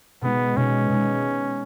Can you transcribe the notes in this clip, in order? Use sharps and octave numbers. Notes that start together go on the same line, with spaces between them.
B2 G#3 B3 D#4
B2 G#3 C#4 D#4
B2 G#3 D#4